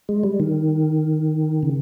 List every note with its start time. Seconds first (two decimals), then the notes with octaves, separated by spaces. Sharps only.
0.09 G#3
0.23 G3
0.40 D#3
1.63 C#3